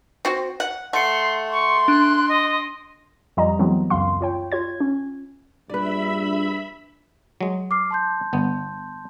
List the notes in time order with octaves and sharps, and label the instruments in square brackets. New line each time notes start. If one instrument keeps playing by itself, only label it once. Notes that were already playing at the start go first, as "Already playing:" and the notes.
[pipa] C4 F#4
F#5
[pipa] A3 [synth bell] F#5 C#7 [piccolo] C6
[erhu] C6 [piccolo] C#6
[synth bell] D4 [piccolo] F#6
[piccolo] D#5
[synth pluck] F2 F3 G3 D#5 A#5
E3 F#3 G#3 B3 C4
C#2 F#2 F5 C6
F4 C#5 G5
F4 C#5 G#6
C#4
[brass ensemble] A#1 G2 [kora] B4 D5 [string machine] E5 B5
[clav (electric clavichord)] F#3 G#3
[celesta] D6 F6 C7
A5 C6 G6
[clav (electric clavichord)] G1 B3